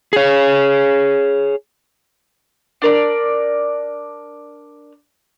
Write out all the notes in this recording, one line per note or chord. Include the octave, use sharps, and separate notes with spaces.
G#4 C#5
D4 A#4 D5